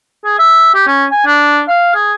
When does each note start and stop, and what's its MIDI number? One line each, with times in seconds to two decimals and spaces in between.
0.24 0.34 68
0.39 0.74 76
0.74 0.86 67
0.87 1.05 61
1.11 1.22 80
1.26 1.61 62
1.68 1.92 77
1.94 2.13 68